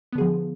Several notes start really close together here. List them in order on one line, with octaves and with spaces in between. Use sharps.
B3 D3 G#4 F3